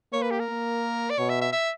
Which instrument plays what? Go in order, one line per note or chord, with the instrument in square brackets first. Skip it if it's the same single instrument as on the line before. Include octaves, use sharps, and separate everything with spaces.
[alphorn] A#3 [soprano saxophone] C#5
[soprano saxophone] B4
G4
A#4
[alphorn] A#3
[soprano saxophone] D5
[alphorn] B2 [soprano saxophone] C#5
[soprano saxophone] E5
E5
E5